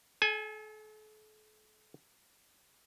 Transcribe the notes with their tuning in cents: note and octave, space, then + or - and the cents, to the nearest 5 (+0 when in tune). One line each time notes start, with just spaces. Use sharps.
A4 -40 G#5 +0